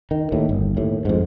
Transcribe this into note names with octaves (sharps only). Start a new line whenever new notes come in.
D#3
D#2 A2
G1
D#2 A2
F2 G#2